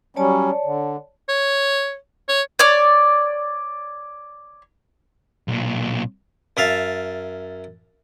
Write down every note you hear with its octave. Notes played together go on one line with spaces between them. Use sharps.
F#3 G3 C#4 C#5 D5 A5
D3
C#5
C#5
C#5 D5
B1 A#2
F#2 E5 F5 A5